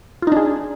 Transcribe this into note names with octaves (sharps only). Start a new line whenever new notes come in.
D4 D#4 F4 G#4